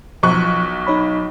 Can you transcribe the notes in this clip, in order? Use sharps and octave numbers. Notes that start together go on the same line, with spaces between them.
B1 F3 C#6 F#6
D#4 C#5 B5